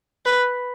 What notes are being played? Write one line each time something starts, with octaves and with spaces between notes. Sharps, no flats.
B4